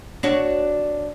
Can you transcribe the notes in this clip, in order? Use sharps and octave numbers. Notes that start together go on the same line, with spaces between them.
D4 F#4 C#5